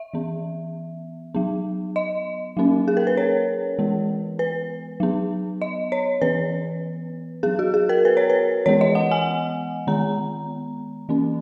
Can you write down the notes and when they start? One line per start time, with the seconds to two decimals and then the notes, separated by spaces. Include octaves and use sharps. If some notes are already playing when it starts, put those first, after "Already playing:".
Already playing: E5
0.14 E3 B3
1.35 F#3 B3
1.96 D#5
2.57 F#3 A#3 C#4
2.88 G#4
2.97 A#4
3.07 B4
3.17 C#5
3.79 E3 G#3 B3
4.39 B4
5.00 F#3 B3
5.62 D#5
5.92 C#5
6.22 E3 B3 B4
7.43 F#3 B3 G#4
7.59 F#4
7.74 G#4
7.89 A#4
8.05 B4
8.17 C#5
8.30 B4
8.66 E3 G#3 B3 C#5
8.81 D#5
8.95 F#5
9.11 G#5
9.87 D#3 G#3 B3 A#5
11.09 E3 A#3 C#4